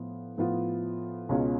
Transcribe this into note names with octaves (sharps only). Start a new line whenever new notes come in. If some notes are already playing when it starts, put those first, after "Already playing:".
Already playing: A2 F3 B3 F4
A2 F3 B3 F4
C#2 B2 G#3 C#4 F4